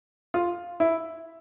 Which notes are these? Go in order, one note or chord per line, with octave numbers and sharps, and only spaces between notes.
F4
E4